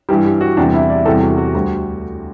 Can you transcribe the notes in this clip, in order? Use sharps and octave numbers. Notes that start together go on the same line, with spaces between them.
G2 E3 G3 G4
G4
F#4
E2 C3 E3 G3 D4
E4
D5
E2 C3 G3 A4
F#4
F#4
D2 D3 G3